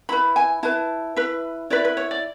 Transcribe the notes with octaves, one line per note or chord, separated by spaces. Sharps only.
E4 B4 B5
G#5
E4 B4 A5
E4 B4
E4 B4 D5
B4
C#5
D5